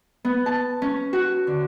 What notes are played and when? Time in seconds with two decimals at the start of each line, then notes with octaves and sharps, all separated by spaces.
0.25 B3
0.46 A5
0.82 C#4
1.13 F#4
1.47 D3